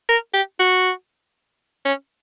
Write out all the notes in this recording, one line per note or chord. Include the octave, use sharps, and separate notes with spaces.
A#4
G4
F#4
C#4